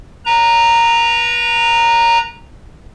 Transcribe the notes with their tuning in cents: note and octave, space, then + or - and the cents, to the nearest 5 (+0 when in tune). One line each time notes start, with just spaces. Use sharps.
B4 -30 A#5 -5